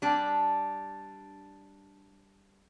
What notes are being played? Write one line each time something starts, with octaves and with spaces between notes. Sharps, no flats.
G3 D4